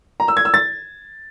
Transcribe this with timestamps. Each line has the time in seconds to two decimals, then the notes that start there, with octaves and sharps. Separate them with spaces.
0.20 A#5
0.28 E6
0.37 G#6
0.45 E6
0.54 A6